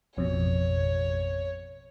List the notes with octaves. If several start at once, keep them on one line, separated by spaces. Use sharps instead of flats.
A1 F2 B2 C#5